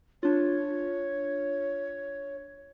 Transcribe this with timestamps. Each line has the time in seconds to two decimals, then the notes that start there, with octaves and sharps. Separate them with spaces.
0.23 D4 F4 C#5